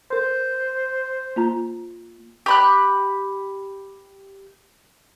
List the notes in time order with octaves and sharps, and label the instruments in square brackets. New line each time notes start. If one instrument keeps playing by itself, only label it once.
[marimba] A#4 C6 [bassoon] C5
[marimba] A#3 F4 A#5
[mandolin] G4 B5 F#6